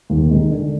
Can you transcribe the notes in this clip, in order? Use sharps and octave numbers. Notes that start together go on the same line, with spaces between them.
D#2
D#3 G#3
D3